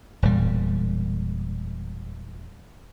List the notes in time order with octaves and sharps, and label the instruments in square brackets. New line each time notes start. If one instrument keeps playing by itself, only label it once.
[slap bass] E1 A#2 G3